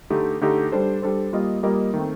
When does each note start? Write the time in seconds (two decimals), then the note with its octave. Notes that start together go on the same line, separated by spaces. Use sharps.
0.10 D3 A3 D#4 G4
0.41 D3 A3 D#4 G4
0.72 G3 D4 A4 C5
1.02 G3 D4 A4 C5
1.33 G3 A#3 F4 A#4 D#5
1.63 G3 A#3 F4 A#4 D#5
1.94 D#3 A3 C4